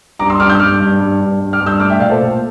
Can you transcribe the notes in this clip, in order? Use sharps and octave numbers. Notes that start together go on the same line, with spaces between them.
G2 A#5 D6
C6 E6
G2 D6 F6
E6 G6
G2 D6 F6
G2
G2
G2
G2
D6 F6
G2
E6 G6
A3 D6 F6
E5 G5
A#2 D5 F5
A4 C5
A#2